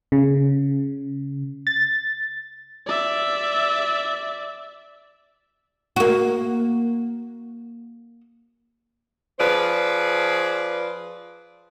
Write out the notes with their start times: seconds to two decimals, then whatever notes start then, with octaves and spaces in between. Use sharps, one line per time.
0.12 C#3
1.67 A6
2.86 D5 E5
5.96 A#3 F#4
9.39 F3 G#4 B4 C5 D5